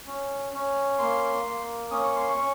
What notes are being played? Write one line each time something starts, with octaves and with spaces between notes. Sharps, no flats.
C#4
C#4
A#3 C6
A#3
C#4 D#6
C#6
C6
C#6
C#4